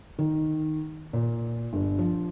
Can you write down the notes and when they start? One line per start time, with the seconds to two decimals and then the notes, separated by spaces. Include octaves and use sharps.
0.19 D#3
1.13 A#2
1.73 G1
1.99 F3